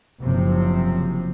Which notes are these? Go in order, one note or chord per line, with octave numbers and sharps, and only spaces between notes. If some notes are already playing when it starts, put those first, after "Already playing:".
F#1 C3 F3 C4